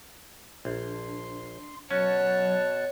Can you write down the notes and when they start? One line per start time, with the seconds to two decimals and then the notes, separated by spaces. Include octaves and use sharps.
0.65 A#1 D4 C6
1.91 B2 F#3 C#4 C#5 F#5 A5